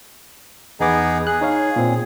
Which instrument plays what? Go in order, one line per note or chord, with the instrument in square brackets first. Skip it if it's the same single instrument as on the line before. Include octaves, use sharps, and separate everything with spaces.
[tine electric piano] E2 D6 [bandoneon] B3 D#4 G#4
[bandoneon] G#4 [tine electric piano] F#6
[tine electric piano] D#4 C#5 F5
A#2 C4